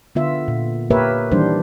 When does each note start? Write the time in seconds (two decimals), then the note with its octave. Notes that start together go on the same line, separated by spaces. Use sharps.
0.15 D3 B3 F4 E5
0.48 A#2
0.90 A#3 G4 A#4 B4 C#5 E5
1.31 D#3 E3 G3 D4 C5